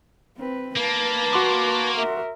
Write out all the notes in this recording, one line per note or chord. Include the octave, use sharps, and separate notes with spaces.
C4 B4
A#3 B4 A5
F#4 C6 D6
A#4 E5